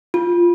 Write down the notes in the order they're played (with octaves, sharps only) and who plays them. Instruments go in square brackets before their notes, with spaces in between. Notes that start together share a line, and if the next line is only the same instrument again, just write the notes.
[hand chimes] F4